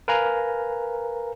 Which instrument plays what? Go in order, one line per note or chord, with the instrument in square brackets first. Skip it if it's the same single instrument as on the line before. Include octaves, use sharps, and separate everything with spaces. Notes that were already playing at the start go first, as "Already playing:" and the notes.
[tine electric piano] A#4 B4 F5 G#5 A#5